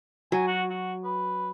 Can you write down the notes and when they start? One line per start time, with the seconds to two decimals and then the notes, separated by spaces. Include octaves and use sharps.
0.32 F#3 G#5
0.47 F#4
0.70 F#4
1.03 B4